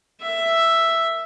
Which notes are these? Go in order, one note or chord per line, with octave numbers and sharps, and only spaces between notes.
E5